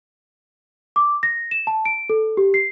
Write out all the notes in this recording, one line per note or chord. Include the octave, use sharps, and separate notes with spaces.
D6
A#6
E7
A5
D7
A4
G4
C7